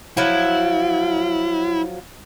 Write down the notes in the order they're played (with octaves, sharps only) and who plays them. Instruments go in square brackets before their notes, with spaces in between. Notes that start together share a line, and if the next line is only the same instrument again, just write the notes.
[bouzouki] F3 F#3 [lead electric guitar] E4